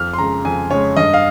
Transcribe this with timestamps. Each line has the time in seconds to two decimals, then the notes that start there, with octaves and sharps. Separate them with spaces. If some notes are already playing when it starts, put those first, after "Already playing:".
Already playing: F2 F6
0.13 C6
0.18 C#3 G#3 A#5
0.45 F2 G#5
0.70 C#3 G#3 C#5
0.96 G2 D#5
1.14 F5